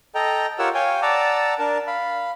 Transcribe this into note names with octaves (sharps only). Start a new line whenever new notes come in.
A4 D#5 G5 A#5
F4 G4 A#4 C#5 F#5 E6
C#5 F5 G5 G#5
D5 F#5 A5 A#5 D6 E6
D4 A#4 A5
F5 B5